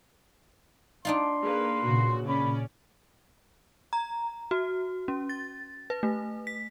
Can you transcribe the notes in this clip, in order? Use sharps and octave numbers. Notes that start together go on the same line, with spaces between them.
D4 D#4 F4 C6
A#3 G#4 B4
A#2 C#3 F#4
C#4 D5 B5
A#5
F#4
C#4
A6
B4
A3
B6